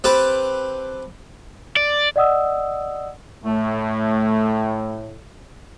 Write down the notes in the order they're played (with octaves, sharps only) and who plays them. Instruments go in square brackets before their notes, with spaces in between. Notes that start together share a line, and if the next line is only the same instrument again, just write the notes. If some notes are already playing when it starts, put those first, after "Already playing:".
[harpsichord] C4 G4 A4 B4
[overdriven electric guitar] D5
[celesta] D5 D#5 F#5 D#6 E6
[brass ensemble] A2 [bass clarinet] A3